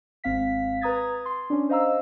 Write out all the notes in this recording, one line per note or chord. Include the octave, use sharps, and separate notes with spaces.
G#1 C4 F5 B6
B4 A#5 D#6 G#6 A6
C6
C#4 D4
C5 D#5 F5 A#5 E6